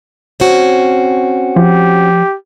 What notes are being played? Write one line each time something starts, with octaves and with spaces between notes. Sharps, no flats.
C4 C#4 F#4
F3 G4